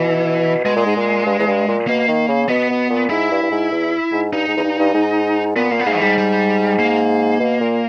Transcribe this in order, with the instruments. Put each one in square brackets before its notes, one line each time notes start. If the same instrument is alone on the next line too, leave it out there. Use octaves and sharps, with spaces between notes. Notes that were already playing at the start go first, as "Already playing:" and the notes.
Already playing: [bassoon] B2 [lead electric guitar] E3
[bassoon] B2 [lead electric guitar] G#3
[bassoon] A#2
G#2
A#2
G2
E2
G2
A#2
[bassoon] B2 [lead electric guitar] A#3
[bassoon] D#3
C#3
[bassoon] B2 [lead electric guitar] B3
[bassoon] B2
A#2
[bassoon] G#2 [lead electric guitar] E4
[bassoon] G2
G2
G#2
E2
G#2
[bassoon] G2 [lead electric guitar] D#4
[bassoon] G#2
E2
G2
G2
G#2
[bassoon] A#2 [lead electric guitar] B3
[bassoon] A#2 [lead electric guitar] A#3
[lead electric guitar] B3
[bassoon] G#2 [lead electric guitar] A#3
[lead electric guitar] E3
[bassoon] G#2 [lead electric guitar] G3
[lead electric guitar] G3
A#3
[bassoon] B2
A#2